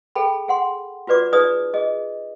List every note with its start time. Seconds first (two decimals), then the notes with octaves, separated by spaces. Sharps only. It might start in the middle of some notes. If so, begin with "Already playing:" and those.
0.15 G#4 A4 G5 B5
0.48 G#4 F#5 C6
1.07 F4 F#4 B4 D5 D6
1.32 D#4 F4 G#4 B4 D5 D#6
1.74 G#4 D#5